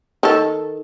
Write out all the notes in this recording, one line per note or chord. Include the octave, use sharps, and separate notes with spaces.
D#3 A4